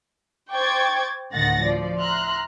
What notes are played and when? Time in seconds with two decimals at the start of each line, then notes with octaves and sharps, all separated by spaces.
0.53 C5 G5 C#6 D6 G#6 A6
1.32 D2 A2 D#3 F#5 A6 A#6
1.63 F3 D5
2.01 E5 A#5 C6 F6 F#6